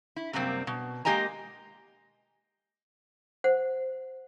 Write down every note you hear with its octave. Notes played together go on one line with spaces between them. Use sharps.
E4
F#2 C3 G3 A#3 C4
B2
G#3 A#3 G4 D#5 G#5 A#5
C5 F#5